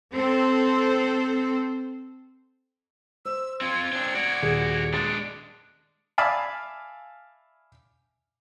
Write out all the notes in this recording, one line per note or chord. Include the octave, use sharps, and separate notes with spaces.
C4 A4 C5
C5 E6
C4 F4 G#6
C4 D4
F#4 D5
D#1 G#4
G#3 D4 A6
D5 E5 F5 G#5 A5 B5